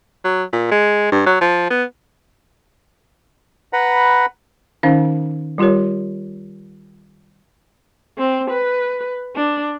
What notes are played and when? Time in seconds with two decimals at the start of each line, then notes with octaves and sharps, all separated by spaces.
0.25 F#3
0.53 A#2
0.72 G#3
1.12 G2
1.26 F#3
1.41 F3
1.70 B3
3.73 B4 F#5 A#5 B5
4.83 D#3 C#4 D#4 C5 F5
5.58 G3 F4 G4 A#4 C#5
8.18 C4
8.50 B4
9.36 D4